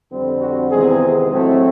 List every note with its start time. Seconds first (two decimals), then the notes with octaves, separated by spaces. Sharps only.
0.11 F2 D3 G3 C4
0.41 F#4
0.71 E2 C3 D#3 G#3 C4 G#4
1.31 A2 F#3 A3 C4